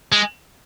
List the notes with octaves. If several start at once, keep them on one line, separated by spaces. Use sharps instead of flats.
G#3